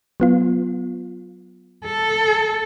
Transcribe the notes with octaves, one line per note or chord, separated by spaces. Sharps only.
F#3 B3 F4
A4